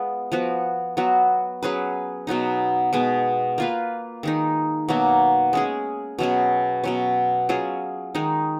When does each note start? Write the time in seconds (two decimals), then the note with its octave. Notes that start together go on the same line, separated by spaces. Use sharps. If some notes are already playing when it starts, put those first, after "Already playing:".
Already playing: G#3 B3 F4
0.32 F3 B3 F#4
0.97 F#3 B3 F#4
1.63 F#3 C#4 G#4 B4
2.27 B2 F#3 B3 D#4
2.93 B2 G#3 B3
3.58 A#3 F4 B4
4.23 D#3 G#3 D#4
4.88 B2 F#3 A#3
5.53 G#3 C#4 G#4
6.19 B2 F#3 C#4 G#4
6.84 B2 F#3 C#4
7.49 F#3 C#4 F4 G#4
8.15 D#3 G#3 D#4